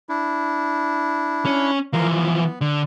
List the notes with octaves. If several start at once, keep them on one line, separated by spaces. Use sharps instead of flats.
D4 E4
C#4
E3 F3 A#4 F5
B3
D3